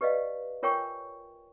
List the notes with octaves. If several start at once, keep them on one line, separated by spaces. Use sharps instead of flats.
G4 B4 D5 D#5 F5
F4 A#4 C#5 G5 G#5 C#6